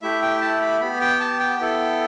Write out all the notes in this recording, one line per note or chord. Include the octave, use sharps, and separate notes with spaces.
A3 E4 G4 E5
G5
A5
B5
B3 G4 B5
G5
A5
G5
B3 E4 A4